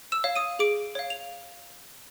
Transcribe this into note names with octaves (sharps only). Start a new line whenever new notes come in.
E6 E7
C#5 F5
D#6 D#7
G#4 D6 D7
C#5 F5
F7